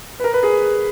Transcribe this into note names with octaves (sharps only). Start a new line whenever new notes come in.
B4
A#4
B4
G#4